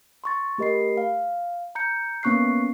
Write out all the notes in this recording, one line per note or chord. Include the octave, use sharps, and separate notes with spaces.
C6 C#6 A6
A3 G4 A#4 D#5 B5 C7
F5
A#5 G6 C#7
A#3 B3 C#4 C#6 F#6 C7